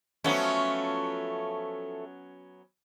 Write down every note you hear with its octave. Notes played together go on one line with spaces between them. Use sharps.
F3 F#3 A3 B3 C#4